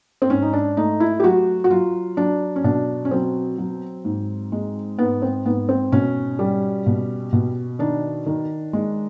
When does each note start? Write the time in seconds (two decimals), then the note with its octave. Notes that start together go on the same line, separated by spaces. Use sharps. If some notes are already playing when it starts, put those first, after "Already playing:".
0.22 C4
0.30 G#2 C#4
0.42 D#4
0.53 D4
0.77 A3 D#4
1.00 E4
1.20 G4
1.24 F#3 F#4
1.64 F#4
1.70 F#3 F4
2.17 F#3 D4
2.56 C#4
2.64 B2 D4
3.05 C#4
3.11 F#3 C4
3.58 F#3
4.05 G#2
4.52 G#3
4.99 G#2 B3
5.22 C4
5.45 G#2 B3
5.69 C4
5.92 B2 C#4
6.39 G3
6.86 B2
7.33 B2
7.79 D#3 D4
8.27 D#3
8.73 G#3